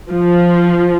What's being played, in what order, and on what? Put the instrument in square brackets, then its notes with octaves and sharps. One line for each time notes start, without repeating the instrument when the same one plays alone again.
[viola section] F3